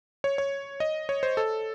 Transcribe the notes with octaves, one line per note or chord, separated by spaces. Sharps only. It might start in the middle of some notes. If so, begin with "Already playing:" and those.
C#5
C#5
D#5
C#5
C5
A4